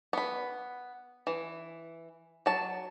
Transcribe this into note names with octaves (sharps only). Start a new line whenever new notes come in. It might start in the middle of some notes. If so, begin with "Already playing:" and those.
B3 B5
E3
F#3 A5